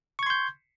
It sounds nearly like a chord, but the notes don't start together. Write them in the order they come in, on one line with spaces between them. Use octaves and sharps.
C#6 G#6 C6 G6